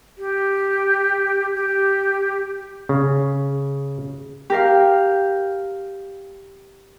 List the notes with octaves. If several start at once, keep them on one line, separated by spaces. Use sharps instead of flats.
G4
G4
C#3
G4 A#4 F5